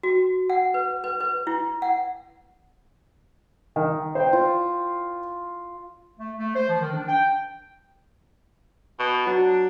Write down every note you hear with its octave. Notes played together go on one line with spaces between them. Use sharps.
F#4
F#5
B4
B4
B4
E4
F#5
D#3
C5 G5
F4
A3
A3
C5
F3
D#3
D4
G5
B2
F#3 D4